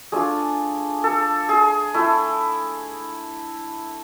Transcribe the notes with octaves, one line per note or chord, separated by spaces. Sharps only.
A3 D4 F4 G#4
A4
G#4
A3 E4